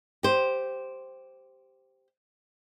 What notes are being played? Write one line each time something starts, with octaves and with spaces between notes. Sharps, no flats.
G4 C5